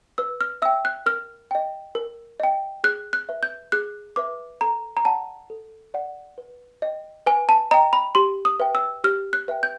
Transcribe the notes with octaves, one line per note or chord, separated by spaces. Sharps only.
B4 E6
F6
E5 G5 E6
F#6
A#4 F6
D#5 G5
A#4
D#5 G5
G#4 F#6
F#6
B4 E5
G6
G#4 F#6
B4 E5 D6
A4 A#5
A#5
D5 F#5 A5
A4
D5 F#5
B4
D#5 G5
B4 G#5
A5
D#5 G5 A#5
B5
G4 C6
D#6
B4 E5 G5
E6
G4 F6
F#6
B4 E5 G5
G6